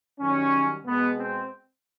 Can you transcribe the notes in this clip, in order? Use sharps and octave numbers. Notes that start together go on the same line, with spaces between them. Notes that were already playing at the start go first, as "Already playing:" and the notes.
F#2 D#3 G3 C#4
B2 G#3 B3
C4